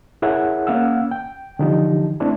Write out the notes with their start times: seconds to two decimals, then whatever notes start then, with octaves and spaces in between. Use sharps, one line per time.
0.22 E4 G#4 A#4 C#5 E5 F#5
0.67 A#3 C#4 F5 F#5 E6
1.11 G5
1.59 D3 E3 F3 D#4 G4
2.20 A3 C4 D4 E4